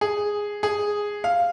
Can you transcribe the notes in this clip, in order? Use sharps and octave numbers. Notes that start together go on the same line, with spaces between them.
G#4
G#4
F5